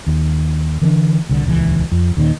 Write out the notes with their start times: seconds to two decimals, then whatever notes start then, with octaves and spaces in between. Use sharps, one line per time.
0.07 D#2
0.82 D3 E3 B3 D4
1.29 C2 D3
1.46 D#1 C#2 C3 E3
1.92 F2
2.17 D#2 A#2 D#3